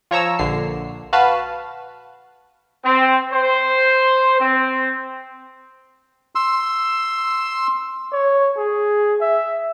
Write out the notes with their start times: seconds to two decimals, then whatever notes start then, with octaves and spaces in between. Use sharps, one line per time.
0.11 F3 C#5 A#5 E6
0.39 A#1 D3 C7
1.13 F#4 B4 F5 A5
2.85 C4
3.33 C5
4.41 C4
6.35 C6 E6
8.12 C#5
8.57 G#4
9.21 E5